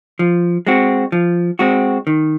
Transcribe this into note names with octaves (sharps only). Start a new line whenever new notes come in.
F3
G#3 C4 F#4
F3
G#3 C4 F#4
D#3